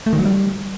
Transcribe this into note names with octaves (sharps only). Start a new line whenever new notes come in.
A3
D#3
F#3
G3